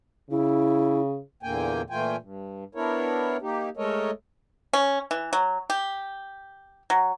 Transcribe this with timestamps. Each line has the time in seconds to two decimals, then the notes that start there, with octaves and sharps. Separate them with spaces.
0.31 C#3 E4
1.43 E2 A#2 D3 A#3 G5 G#5
1.90 A#2 E3 A3 F4 G5 G#5
2.21 G2
2.75 B3 D4 E4 A#4 C#5
3.42 A#3 D#4 G4
3.77 G#3 A3 A4 A#4 C#5 D#5
4.73 C#4
5.11 E3
5.33 F#3
5.70 G4
6.90 F#3